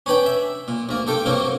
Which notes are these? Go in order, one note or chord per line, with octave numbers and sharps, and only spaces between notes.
C#4 D4 B4 G5
E5
A#2
D2 A#3
G2 A4 G5
G2 F#3 A#3 C4